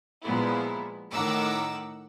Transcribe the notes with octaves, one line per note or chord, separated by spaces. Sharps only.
A#2 F3 G#3 B3 E4
A2 D#3 A#4 F#5 D6 E6